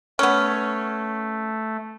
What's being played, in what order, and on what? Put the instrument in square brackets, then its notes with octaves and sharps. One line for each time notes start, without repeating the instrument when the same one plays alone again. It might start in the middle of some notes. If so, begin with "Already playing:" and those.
[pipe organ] A3 [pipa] B3 C#4